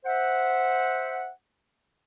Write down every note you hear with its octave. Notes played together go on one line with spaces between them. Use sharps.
C5 E5 F#5